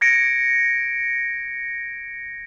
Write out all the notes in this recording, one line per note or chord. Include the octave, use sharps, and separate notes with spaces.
G#6 A#6 C#7 D7